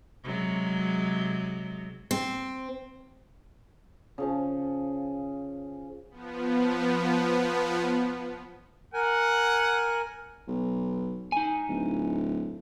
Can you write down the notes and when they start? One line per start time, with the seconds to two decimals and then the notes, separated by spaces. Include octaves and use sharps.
0.24 C3 F#3 G#3
2.11 C4
4.18 C#3 F3 C#4
6.11 F3 B3
8.94 A#4 F#5 G#5
10.47 B1
11.32 D#4 G#5
11.69 D1